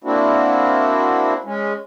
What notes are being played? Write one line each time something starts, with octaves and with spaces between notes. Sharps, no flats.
A#3 C4 D4 E4 F#4
G#3 C#4